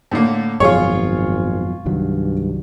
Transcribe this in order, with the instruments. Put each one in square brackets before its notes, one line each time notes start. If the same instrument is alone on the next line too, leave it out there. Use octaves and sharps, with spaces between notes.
[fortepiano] A2 D3 A#3
[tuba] G#1 [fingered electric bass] F#2 B2 F3 [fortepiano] F4 G#4 C#5
[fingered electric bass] C2 D#3 F#3 [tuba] G2